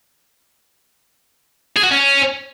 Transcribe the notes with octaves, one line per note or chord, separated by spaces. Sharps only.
G#4
F#4
C#4